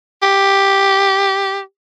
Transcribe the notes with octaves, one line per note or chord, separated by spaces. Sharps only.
G4